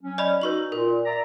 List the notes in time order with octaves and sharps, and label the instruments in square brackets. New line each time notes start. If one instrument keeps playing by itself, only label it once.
[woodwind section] F#3 C#4
[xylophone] D5 D#5 B5
[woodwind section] D#4 F#4 [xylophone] B4 C#6 F#7
[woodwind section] A#2 [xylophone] A#4
[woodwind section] D5 E5 A#5